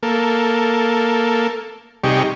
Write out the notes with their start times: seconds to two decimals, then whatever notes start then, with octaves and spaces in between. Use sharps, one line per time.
0.03 A#3 A4
2.04 C3 G3 D#4 G4 G#4 C#6